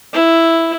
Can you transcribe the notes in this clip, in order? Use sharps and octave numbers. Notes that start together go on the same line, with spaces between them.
E4